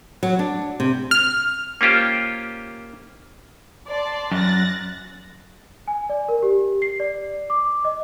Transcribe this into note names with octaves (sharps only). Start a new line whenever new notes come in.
F#3
D4
C3
F6
A#3 C#4 F4 G4 C5
D5 A5 C6
F#2 F#6 A6 A#6
G#5
D5
A#4
G4
C7
D5
D6
D#5